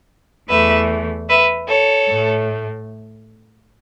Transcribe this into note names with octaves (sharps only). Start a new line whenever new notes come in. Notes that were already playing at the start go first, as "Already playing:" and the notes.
E2 E3 A3 B4 E5
B4 E5
A4 C#5
A2 A3